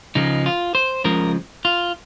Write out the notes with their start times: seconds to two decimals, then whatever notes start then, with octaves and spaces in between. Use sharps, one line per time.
0.15 C#2 C#3 F3 G#3 D#4
0.46 F4
0.75 C5
1.04 C#2 C#3 F3 G#3 A#4
1.65 F4